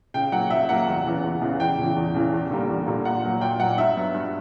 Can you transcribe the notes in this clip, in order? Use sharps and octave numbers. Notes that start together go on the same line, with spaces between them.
C#3 G5
F#3 A#3 F#5
C#3 E5
F#3 A#3 F#5
E2
C#3 E3 B3
E2
C#3 E3 B3
E2 G5
C#3 E3
E2
C#3 E3
E2
D3 G3 A#3
E2
D3 G3 A#3
A#2 F#5
F#3 A#3
A#2 G5
F#3 A#3 F#5
G2 E5
F#3 B3
G2